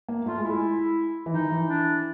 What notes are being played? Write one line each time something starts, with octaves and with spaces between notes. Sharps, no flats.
A#3
A3 F4
G#3
E4
G#3
E3
D#3 D#4
E3
D4